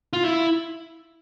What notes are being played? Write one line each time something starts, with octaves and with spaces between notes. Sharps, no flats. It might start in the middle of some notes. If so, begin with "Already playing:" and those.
F4
E4